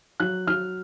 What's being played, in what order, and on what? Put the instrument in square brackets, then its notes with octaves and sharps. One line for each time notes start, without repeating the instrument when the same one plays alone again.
[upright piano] F#3 F#6
F#3 F6